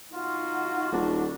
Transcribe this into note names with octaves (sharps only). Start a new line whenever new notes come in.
D#4 F4 F#4
D#1 D4